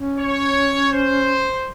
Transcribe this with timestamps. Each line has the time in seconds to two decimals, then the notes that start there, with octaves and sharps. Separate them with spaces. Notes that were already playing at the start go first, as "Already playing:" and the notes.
Already playing: C#4
0.18 C#5
0.92 C5